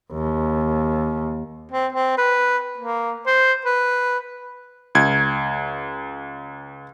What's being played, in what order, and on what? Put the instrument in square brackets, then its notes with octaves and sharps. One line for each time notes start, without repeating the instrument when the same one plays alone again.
[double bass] D#2
[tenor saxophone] C4
C4
B4
A#3
C5
B4
[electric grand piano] C#2 G#6